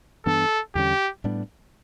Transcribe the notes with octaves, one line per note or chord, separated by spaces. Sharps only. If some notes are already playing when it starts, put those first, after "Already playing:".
G2 E3 B3 D4 A4
E2 D3 G3 C#4 G4
A2 G3 B3 D4